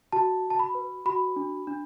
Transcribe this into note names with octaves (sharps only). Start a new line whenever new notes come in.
F#4 A5
F#4
A5
B5
B4
F#4 B5
D4
D4